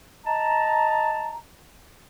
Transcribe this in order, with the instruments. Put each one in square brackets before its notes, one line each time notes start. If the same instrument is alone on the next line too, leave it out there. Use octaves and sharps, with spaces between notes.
[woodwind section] D#5 A5 A#5